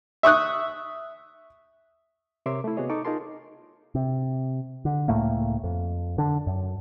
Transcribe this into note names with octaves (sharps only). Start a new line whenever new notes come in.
E5 C#6 D#6 F#6
C3 A#4 C#5 E5 C6 D6
A3 E4
C3 B3 F#4 G#4 C#5 D#5
D#4 A4 C#6 D6
D#4 F4 G#4 A#4 A5 C6
C3
D3
C#2 A2 A3 A#3
F2
D3 D4
F#2